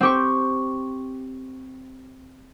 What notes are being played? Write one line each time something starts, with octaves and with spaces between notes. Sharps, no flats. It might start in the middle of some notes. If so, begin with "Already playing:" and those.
C4 G4 C#6